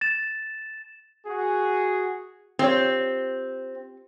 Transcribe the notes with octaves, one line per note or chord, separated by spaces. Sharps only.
A6 E7
F#4 G#4
C4 F4 G4 C#5